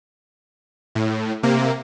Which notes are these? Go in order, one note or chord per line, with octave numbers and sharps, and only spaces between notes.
A2
C3 A#3